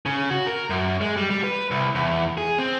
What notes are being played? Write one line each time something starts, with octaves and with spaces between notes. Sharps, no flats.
C#3
F#4
A#4
F#2
G#3
G3
G3
B4
C2
E2
G#4
C4